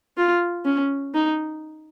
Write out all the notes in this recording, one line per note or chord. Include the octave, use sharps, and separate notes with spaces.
F4
C#4
D#4